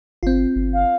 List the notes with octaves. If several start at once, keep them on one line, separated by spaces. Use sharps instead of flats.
G1 C4 F4
G1
F5